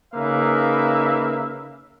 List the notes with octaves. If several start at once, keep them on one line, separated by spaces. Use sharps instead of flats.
C#3 A#3 D#4 B4 E5 F5